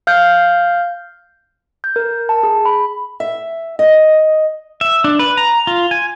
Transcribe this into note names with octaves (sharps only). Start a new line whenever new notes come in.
F5 F6 G6
G6
A#4
A5
G#4
B5
E5
D#5
E5
D4
B4
A#5
F4
G#5